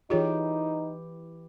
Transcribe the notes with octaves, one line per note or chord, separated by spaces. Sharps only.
E3 D#4 F4 G4 G#4 C#5